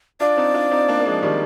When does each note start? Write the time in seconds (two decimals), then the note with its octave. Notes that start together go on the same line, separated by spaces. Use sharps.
0.20 D4 F4 D5
0.37 C4 D#4
0.54 D4 F4
0.71 C4 D#4
0.88 A#3 D4
1.00 A#3
1.06 F3 G#3
1.23 D#3 G3